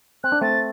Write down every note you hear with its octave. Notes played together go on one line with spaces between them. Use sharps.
C4 F#6
D4
A3 C4 A6